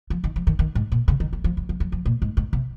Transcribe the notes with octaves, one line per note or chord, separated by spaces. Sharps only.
F3
D#3
F3
D#3
D#3
G#2
A#2
C#3
D#3
F#3
F3
F#3
F3
F#3
F3
A#2
G#2
G#2
C3